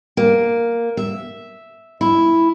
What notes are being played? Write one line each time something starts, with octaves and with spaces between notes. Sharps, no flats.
A#3
E5
E4